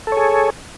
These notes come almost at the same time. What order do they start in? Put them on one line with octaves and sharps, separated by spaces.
A4 C#5 G#4